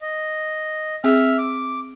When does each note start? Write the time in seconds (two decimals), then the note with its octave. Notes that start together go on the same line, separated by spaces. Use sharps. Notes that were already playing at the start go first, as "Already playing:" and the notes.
0.01 D#5
1.04 C4 G#4 E5 F6
1.38 D6